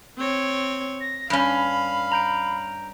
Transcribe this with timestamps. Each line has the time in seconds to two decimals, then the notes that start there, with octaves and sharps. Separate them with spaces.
0.18 C4 C#5
1.00 A#6
1.30 G2 C#4 F5 B5
2.12 A#5 G6 D7